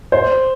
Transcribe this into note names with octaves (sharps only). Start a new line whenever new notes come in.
C5